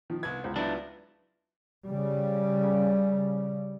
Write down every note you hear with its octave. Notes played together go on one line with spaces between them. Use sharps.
D#3 F3
C2 B3 G#6
C#2 C5
F#3 B3 D4 E4 F4
C#3 G3